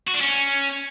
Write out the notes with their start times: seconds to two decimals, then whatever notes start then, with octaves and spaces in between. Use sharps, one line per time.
0.08 F#4
0.14 D4
0.21 C#4